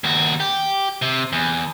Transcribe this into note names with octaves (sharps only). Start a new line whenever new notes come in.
D#2 F#4
G4
C3
E2